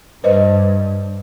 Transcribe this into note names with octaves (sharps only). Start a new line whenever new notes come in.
G2 B4 C5 D#5